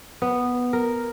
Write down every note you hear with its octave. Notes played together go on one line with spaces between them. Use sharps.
B3
A#4